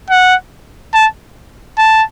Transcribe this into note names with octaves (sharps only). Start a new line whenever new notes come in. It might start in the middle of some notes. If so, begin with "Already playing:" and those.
F#5
A5
A5